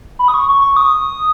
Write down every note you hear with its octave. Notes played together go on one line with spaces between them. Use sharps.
B5
D#6
C#6
C#6
C#6
D#6